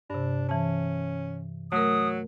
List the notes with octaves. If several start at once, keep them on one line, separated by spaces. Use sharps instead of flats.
G2 C3 D4
E3 C#4 A5
F#3 A3 A#4 D#6